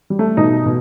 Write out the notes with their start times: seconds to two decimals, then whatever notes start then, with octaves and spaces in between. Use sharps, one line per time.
0.10 G3
0.19 A3
0.37 B2 D#4
0.66 B2